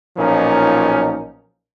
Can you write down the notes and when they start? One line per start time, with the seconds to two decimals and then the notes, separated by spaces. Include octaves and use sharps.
0.17 B1 A#2 F3 C#4 D#4 A#4